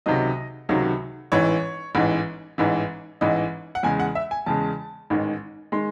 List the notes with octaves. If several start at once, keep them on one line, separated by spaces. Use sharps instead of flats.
C#2 C3 D#3 F#3 D#5
C#2 C3 D#3 F#3
A1 G#2 E3 C#5
A1 G#2 E3
A1 G#2 E3
A1 G#2 E3 D#5
F#5
E2 C#3 G#3 G#5
F#5
E5
G#5
E2 C#3 G#3 A5
A1 G#2 D#3 G#3
D#3 G#3 C6